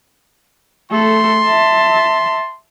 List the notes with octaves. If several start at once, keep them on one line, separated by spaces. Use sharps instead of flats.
A3 A4 C6
E5 A5